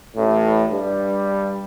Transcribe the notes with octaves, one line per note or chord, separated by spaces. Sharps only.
A1 A2
G2 G3